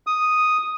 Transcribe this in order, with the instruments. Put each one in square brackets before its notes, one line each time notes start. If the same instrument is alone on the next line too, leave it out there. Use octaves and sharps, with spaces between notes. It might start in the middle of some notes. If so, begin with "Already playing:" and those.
[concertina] D#6